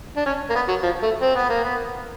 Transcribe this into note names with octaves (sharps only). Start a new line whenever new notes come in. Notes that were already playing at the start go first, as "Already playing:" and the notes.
D4
C#4
A#3
B3
F#3
F3
A3
C4
B3
A#3
B3